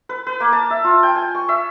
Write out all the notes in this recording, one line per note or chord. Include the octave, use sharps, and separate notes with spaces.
B4
B4
A#3
A5
E5
F4
G5
G#5
C#6
E5